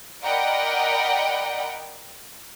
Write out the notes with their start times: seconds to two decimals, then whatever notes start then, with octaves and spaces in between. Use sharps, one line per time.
0.23 A#4 D5 D#5 F#5 G5 B5